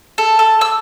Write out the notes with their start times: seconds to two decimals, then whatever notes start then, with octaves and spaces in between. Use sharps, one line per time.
0.18 A4
0.39 A4
0.61 E6